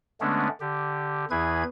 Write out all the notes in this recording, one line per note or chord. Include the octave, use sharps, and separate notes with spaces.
D3 G#3 A3 B3 C#4 D4
D3 G4
E2 E3 E4 G#4 B4 G#6